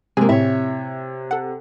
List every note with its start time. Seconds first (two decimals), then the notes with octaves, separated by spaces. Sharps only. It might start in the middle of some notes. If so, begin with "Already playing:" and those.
0.17 C3 G#3 A#3 G#4 G#5
0.29 A2 C4 E4 C#5 E5
1.31 A4 F#5